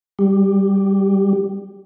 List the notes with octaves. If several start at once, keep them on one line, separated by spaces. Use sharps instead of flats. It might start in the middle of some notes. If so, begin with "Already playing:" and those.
G3 G4